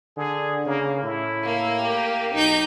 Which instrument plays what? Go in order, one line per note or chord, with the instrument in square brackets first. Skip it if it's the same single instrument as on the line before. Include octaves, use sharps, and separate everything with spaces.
[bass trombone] D3 [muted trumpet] G#4
[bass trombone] C#3 [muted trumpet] A#3
[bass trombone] A2 [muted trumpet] E4
[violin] A#3
[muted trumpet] G4
[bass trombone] B1 [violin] D#4 G6